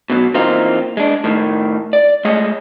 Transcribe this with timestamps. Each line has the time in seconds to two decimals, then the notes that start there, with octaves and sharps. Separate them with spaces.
0.10 B2 D3 F#3
0.34 E3 A#3 C4 D#4 F4
0.97 G#3 D4
1.24 A2 D#3
1.93 D5
2.25 G#3 A3 G#4 C#5 D#5